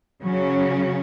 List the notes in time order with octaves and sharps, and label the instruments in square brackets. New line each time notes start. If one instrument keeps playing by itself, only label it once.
[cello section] C#3 F#3 C#4